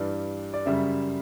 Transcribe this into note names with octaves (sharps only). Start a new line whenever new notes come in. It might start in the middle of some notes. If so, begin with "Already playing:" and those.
Already playing: G2 E3 G3 D5
D5
F#2 C#3 G3 E5